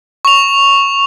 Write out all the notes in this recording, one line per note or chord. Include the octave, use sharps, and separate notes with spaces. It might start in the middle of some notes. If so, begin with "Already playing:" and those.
C#6 F7